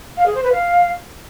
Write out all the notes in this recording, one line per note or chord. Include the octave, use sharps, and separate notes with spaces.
F5
G#4
C5
B4
F5